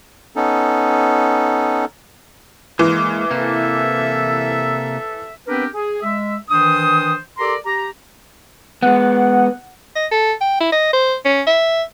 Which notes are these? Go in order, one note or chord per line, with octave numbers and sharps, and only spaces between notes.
B3 C#4 D#4 A4
E3 G#3 A#3
C3 A#3 A4 E5
B3 C4 D4 G4 A#4 B4
G#4
G#3 E5
D#3 E3 D4 C5 D#6
G4 A4 A#4 D5 A#5 C6
G4 A#5
G#3 B3 F#5
D#5
A4
G5
E4
D#5
C5
C#4
E5